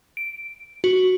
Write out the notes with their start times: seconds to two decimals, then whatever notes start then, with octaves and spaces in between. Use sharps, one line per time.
0.17 D7
0.84 F#4